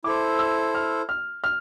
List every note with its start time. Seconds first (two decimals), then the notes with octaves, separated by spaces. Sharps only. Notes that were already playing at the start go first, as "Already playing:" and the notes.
0.04 E4 A4 C5 D6
0.39 E6
0.75 F6
1.09 F6
1.44 F6